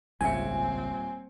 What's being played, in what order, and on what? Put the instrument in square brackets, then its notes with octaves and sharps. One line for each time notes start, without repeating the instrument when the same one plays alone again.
[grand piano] D#1 E5 C#7 [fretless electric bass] G#1 C#2 C#3 [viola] C4 [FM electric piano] G#5